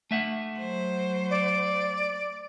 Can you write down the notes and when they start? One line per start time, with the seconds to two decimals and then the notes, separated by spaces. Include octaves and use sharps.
0.11 A3 E5 F#5
0.59 F#3 C5
1.30 D5